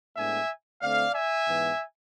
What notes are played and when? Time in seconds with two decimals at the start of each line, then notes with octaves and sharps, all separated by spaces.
0.17 A2 G#3 B3 D4 E5 G#5
0.82 D3 A3 C4 D5 F5
1.15 E5 G#5
1.47 G#2 E3 B3